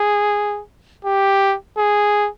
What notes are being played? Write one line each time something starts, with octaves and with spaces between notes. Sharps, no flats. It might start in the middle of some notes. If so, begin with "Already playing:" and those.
Already playing: G#4
G4
G#4